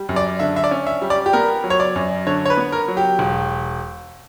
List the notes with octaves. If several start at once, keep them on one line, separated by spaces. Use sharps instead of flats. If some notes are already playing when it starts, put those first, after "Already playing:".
Already playing: G3
F#2
D5
D3 E5
E5
D5
C#4
E5
G3
D5
G4
B3 A#4
F#3
C#5
D5
F#2
D3 C#5
C#5
B4
B3
A#4
F#3
G4
E1